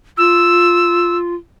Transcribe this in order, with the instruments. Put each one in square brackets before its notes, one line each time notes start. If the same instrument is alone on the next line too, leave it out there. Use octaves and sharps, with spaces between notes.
[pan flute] F4 [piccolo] E6